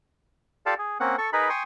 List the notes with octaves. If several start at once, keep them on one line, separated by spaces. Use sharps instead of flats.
F4 G4 A4 D5 F5 A5
G#4
A#3 C4 C#4 F#5
A4 C#6
D#4 G#4 A#4 B4 B5
G5 G#5 C6 C#6 D#6